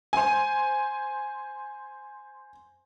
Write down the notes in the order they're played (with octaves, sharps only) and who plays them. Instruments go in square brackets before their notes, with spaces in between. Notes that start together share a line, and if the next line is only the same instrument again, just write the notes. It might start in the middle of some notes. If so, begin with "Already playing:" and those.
[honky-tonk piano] C5 G#5